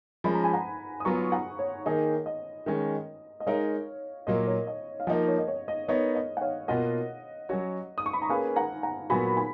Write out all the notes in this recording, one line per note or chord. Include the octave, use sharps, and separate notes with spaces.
F3 G#3 C#4 B5
A#5
G#5
F#5 A#5
D#6
F#3 B3 F4 A#5 C#6
F#5 A#5
C#5
D#3 A#3 D#4 G#4
D#5
D#3 G#3 C#4
D#5
G#3 D#4 A#4 C#5 F5
A#2 F#3 A#3 D#5
C#5
D#5
F5
F3 A#3 D#4 D#5 F#5
C#5
D#5
C#5
D#5
B3 D#4 A#4 C#5 D#5
D#5
F#5
C#5 F5
B2 A#3 F4 D#5 F#5
F#3 C#4 F#4 C#5
D#6
C#6
B5
A#5
A#3 C#4 G#4 B4 F5 G#5
F#5 A#5
F#5 A#5
A#2 F#3 B3 F#4 G#5 B5
G#5 B5